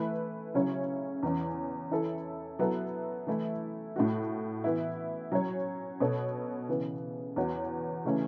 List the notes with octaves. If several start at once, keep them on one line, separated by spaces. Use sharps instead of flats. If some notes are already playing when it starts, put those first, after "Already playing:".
Already playing: E3 A3 E4 B4
C#3 F#3 C#4 E4 C#5
E2 E3 C#4
E3 C#4 E4 A4
F#3 B3 E4 A4
E3 A3 E4
A2 A3 F#4
E3 B3 E4
F#3 C#4 F#4 C#5
B2 B3 A4 C#5
C#3 E3 B3
E2 E3 B3 F#4 C#5
C#3 E3 A3 C#4